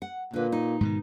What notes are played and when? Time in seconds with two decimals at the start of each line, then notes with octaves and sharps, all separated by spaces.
0.02 F#5
0.33 A#2 D3 B4
0.52 D#4
0.81 G#2 B2 D#3